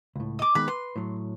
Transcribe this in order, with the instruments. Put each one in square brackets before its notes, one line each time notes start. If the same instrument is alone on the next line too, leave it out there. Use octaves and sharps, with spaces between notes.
[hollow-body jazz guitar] C#2 A2
[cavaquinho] D#5 D6
[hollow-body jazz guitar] D#3 G#3 B3 [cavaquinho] B4 B5
[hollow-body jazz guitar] B4 [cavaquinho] C6
[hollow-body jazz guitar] A2 F#3